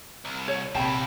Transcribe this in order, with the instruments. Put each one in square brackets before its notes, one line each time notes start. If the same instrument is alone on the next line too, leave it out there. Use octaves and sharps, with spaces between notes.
[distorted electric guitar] C2
[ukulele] C#5
[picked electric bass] A#1 C3 [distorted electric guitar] A#3 E4 [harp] G5 B5 [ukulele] A5